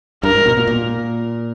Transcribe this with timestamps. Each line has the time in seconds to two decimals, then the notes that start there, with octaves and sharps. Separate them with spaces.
0.23 G2 A#4
0.35 G#2
0.46 B2
0.57 A#2
0.67 A#2